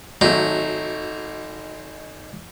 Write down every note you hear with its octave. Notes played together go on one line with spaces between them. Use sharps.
G#1 F#3 A3 D#4